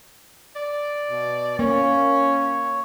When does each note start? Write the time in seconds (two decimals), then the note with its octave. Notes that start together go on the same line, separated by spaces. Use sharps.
0.56 D5
1.10 B2
1.59 A#3 C#4 C#5